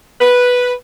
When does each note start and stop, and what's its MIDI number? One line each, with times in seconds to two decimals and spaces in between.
0.21 0.72 71